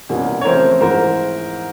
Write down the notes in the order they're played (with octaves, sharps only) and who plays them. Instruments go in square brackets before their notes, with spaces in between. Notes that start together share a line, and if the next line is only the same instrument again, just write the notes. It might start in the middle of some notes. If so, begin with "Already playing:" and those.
[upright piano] C2 B2 G3 A#3 C#4
C#5
E2 C#3 F3 A3 C4 A#4 C5
G#2 E3 A3 A#4 C5